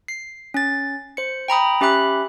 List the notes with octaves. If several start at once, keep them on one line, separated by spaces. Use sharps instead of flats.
C7
C#4 A6
C5 C#7
G5 A#5 B5 D#6
C#4 G4 E5 B5 F#6